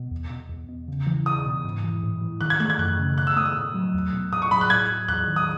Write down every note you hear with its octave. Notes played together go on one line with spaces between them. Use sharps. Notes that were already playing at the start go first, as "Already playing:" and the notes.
Already playing: B2
E2
B2
E2
B2
C#3
E3
E2 D#6
B2
G#2
E3
A2
E3
D#3 F#6
G#6
A3 F#6
G#6
F#2 F#6
C#3
B2 F#6
E6
A3 D#6
E6
A2
F#3
E2
B2
A2 D#6
C#6
F#3 B5
F#6
A2 G#6
F#3
E2 F#6
D#3
D#6